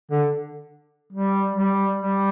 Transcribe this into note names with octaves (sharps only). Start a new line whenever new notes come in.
D3
G3
G3
G3